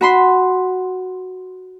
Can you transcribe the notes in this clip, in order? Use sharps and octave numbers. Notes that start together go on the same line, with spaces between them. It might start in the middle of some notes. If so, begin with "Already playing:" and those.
F#4 B5 C6